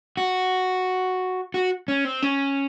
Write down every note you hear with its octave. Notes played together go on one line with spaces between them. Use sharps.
F#4
F#4
C#4
C4
C#4